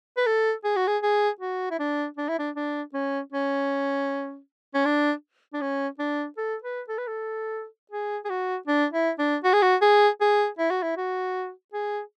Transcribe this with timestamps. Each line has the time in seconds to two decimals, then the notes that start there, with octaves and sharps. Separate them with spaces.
0.17 B4
0.26 A4
0.64 G#4
0.76 F#4
0.87 G#4
1.03 G#4
1.41 F#4
1.71 E4
1.79 D4
2.17 D4
2.28 E4
2.39 D4
2.56 D4
2.93 C#4
3.32 C#4
4.74 C#4
4.85 D4
5.53 D4
5.61 C#4
5.99 D4
6.38 A4
6.63 B4
6.89 A4
6.98 B4
7.07 A4
7.91 G#4
8.25 G#4
8.29 F#4
8.67 D4
8.92 E4
9.18 D4
9.44 F#4
9.53 G#4
9.62 F#4
9.82 G#4
10.21 G#4
10.58 E4
10.71 F#4
10.82 E4
10.97 F#4
11.73 G#4